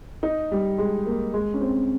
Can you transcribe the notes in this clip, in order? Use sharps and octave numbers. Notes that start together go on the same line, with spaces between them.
D#4
G3
G#3
A#3
G#3
C#4
C4